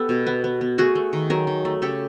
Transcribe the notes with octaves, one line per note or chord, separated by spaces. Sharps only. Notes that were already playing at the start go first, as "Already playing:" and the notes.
Already playing: B3 G4 A4
B2
B3
B3
B3
A3 F#4 G#4
A3
D#3
F#3 G#4 A#4
D#3
A3
C#3 G4 A4